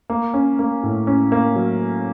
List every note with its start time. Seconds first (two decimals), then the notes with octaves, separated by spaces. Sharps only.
0.10 A#3
0.34 C#4
0.59 A#3
0.83 A2
1.07 C#4
1.32 A#3
1.56 F#3